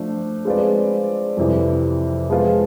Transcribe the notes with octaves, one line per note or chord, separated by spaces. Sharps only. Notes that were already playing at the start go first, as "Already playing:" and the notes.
Already playing: F3 A3 D4
G#3 C4 F4 B4 D5
F2 C3 E3
F3 G#3 B3 F4